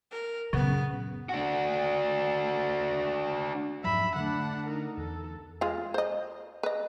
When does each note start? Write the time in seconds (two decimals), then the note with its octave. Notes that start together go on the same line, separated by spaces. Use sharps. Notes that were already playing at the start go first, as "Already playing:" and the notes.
0.12 A#4
0.53 F#2 A#2 C#3 B3
1.29 D4 F#4
3.84 F2 G#2 F#3 E5 B5
4.16 D3 A3 D4 F#5
4.67 D#4 A#4
4.97 E2 A4
5.61 G#3 F4 F5
5.94 C5 D#5
6.63 B4 D#5